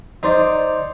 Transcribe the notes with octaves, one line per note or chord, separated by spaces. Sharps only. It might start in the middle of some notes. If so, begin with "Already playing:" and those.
D#4 C5 D5